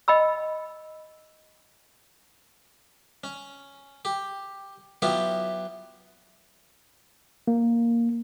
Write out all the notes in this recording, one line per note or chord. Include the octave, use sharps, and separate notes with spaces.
D#5 G5 B5 E6
C#4
G4
F#3 B3 E4 F4 G4
A#3